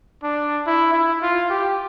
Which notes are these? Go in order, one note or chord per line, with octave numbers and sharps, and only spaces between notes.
D4
E4
E4
F4
G4